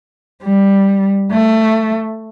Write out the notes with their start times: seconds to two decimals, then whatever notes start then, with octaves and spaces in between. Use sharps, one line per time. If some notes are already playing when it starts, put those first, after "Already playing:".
0.43 G3
1.31 A3